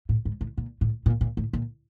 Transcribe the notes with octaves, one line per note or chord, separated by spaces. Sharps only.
A2
G#2
A2
A#2
A2
A#2
A#2
A2
A#2